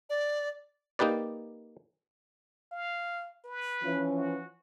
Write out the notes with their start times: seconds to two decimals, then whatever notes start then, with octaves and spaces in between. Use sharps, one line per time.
0.10 D5
0.99 A#3 D#4 G4 B4 D5
2.72 F5
3.45 B4
3.83 E3 F3 C#4
4.18 F#4